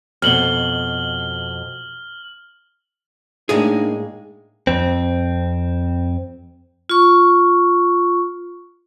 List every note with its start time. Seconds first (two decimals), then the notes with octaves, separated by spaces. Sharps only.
0.22 F2 B2 F6 F#7 G7
3.49 A2 G#3 A#3 D4 D#4 G#4
4.67 F2 C4
6.89 F4 C#6